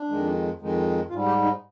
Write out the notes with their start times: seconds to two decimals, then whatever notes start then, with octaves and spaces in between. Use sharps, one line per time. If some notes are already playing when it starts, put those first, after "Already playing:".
Already playing: D4
0.09 F2 D#3 G#3
0.59 F2 D#3 G#3
1.09 G#2 G3 F4
1.26 G4
1.43 D#4